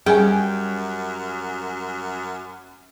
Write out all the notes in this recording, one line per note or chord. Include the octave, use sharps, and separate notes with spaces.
F#2 G3 C#4 G#4 G5 G#5